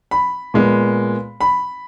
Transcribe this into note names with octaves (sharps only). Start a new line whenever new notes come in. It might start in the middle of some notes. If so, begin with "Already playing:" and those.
B5
A#2 G#3 B3
B5